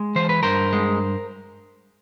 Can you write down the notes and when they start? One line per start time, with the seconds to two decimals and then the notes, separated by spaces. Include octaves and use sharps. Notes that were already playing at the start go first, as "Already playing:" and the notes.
Already playing: G#3
0.16 E3 C5
0.29 B4
0.43 G2 A#4 C5
0.73 G#3